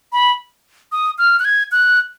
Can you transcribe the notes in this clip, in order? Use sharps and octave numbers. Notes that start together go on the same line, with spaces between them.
B5
D#6
F6
F#6
G#6
F#6